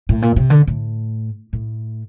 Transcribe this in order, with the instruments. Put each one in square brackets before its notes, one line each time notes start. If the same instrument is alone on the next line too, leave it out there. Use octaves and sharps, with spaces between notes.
[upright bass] A2
A#2
C3
D3
A2
A2